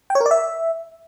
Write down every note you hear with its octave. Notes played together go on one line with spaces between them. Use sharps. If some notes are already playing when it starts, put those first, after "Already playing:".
G5
C#5
A#4
D5
E5